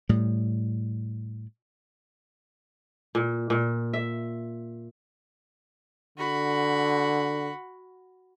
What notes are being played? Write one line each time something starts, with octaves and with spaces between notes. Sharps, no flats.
A2 G3
A#2
A#2
E5
D3 F#4 B5